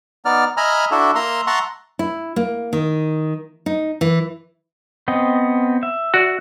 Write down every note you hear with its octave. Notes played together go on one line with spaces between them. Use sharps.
B3 D#4 D5 F6
D#5 E5 G#5 A#5 B5 F6
D4 E4 F#4 A4 E5
A#3 E5 A#5 C6
E5 F#5 A5 A#5 C6 C#6
E4
A#3
D#3
D#4
E3
B3 C4 D#5
E5
F#4 D5